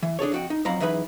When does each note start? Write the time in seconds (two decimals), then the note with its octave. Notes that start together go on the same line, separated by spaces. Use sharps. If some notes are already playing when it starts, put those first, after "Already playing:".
0.03 E3
0.19 D4 G#4 A4 C#5
0.32 F2 F#4 G5
0.50 D#4
0.65 F2 F3 F#3 F5 A#5 B5
0.80 F#2 E3 D#4 G#4 B4 B5